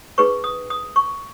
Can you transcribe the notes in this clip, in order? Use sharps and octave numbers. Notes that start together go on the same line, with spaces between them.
D#4 G#4 B4 C#6
D#6
D#6
C#6